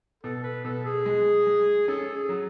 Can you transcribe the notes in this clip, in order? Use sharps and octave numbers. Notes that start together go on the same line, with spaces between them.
B2 A4
B4
B2 A4
G#4
G#3
G#3
C#4 A4
G#4
F#3